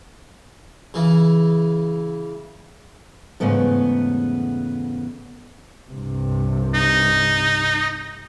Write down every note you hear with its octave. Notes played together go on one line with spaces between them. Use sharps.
C#3 E3
E2 G#2 C#3 A3 B3 A4
C2 G2 C3
D#4